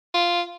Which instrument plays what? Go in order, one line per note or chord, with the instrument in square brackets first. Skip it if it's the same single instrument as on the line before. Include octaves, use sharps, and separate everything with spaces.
[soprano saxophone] F4